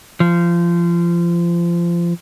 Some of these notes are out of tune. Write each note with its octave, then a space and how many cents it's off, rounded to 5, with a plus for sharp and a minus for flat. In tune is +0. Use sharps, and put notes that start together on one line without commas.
F3 -25